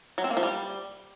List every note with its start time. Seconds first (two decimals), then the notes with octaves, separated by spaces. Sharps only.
0.18 F#3
0.24 C4
0.30 A#3
0.37 F3
0.43 G3